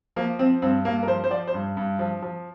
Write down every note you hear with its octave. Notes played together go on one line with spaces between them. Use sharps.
F3 A#3
F3 C4
G2 C4
G2 A#3
A#4
F3 C5
C5
F3 D5
C5
G2
G2
F3
F3